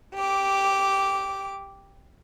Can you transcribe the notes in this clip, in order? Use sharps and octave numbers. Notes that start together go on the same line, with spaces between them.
G4 D6